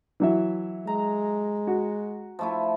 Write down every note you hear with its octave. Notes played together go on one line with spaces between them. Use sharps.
E3 F#3 E5
G#3 A#5
F#4
F3 A3 E4